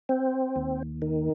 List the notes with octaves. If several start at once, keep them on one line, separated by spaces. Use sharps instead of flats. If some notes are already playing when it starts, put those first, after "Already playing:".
C4
D#2
D#3